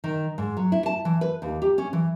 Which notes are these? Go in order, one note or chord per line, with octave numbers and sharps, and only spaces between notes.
D#3
G#2
F#3
E4
A5
E3
B4
D#2
G4
C#4
E3